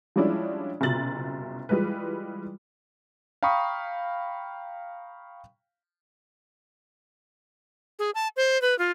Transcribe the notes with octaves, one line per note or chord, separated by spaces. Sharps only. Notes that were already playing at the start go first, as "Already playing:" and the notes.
F3 G3 G#3 C#4 D4 E4
F#1 C2 B2 F4 A6 F#7
E3 G3 G#3 F4 B4
F5 G5 A#5 B5 C#6 D#6
G#4
A5
C5
B4
F4